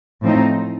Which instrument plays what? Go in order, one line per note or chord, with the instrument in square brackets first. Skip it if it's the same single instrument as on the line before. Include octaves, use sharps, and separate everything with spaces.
[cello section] A2 F3 C4 D#4